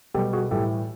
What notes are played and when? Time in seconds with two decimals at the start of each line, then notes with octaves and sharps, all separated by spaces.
0.14 B2 G3 G4 A4
0.33 F#4 G#4
0.51 A2 E3 G3 G4 A4